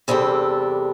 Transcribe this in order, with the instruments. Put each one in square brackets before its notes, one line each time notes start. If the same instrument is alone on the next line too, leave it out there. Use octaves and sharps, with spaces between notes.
[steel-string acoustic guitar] E2 C3 G3 D4 A4